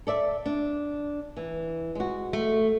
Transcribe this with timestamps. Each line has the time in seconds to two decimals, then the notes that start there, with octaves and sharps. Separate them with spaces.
0.07 A4 D5 E5
0.46 D4
1.37 E3
1.95 G#3 F#4
2.33 A3